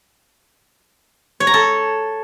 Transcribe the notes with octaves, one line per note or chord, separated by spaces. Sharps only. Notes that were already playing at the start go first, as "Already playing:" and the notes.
C#5
A#5
A4